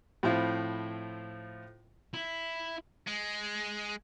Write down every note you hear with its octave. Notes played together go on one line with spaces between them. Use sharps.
A2 F3 C4 E4 F4
E4
G#3